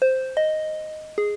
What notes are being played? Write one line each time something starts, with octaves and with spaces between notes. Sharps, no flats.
C5
D#5
G#4